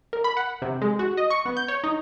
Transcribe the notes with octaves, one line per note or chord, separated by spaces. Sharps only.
A#4
B5
F#5
C3
G#3
F#4
D#5
C#6
B3
G6
C#5
D#4